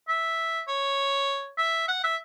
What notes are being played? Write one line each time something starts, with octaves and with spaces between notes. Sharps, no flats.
E5
C#5
E5
F#5
E5